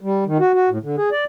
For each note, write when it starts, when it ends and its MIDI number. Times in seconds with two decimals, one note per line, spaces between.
0.01 0.24 55
0.26 0.38 51
0.40 0.52 66
0.54 0.69 66
0.69 0.78 45
0.83 0.96 50
0.97 1.09 68
1.12 1.24 74